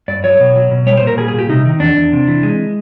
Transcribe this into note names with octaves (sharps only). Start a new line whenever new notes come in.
G2 D5
F#3 C#5
B2
F#3
B2
G3 C#5
C5
A#2
A#4
G3 G#4
G#4
A#2 G4
C3 D#4
D#3
E2 D4
E2
C3
E3
G#3